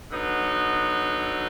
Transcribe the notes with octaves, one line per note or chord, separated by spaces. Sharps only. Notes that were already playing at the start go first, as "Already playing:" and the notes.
D3 F#3 B3 D#4